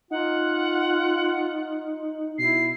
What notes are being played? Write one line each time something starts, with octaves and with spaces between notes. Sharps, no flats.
D#4 F4 F#5
B2 E4 C7